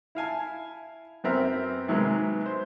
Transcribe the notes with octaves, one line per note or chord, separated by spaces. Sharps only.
E4 F5 G#5 A5
F#2 B3 C4 A#4 E5
C3 D#3 F#3 G#3 A#3 B3
C5